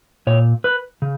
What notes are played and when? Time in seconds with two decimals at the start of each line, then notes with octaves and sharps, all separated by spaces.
0.27 A#2 C#5
0.64 B4
1.02 C#3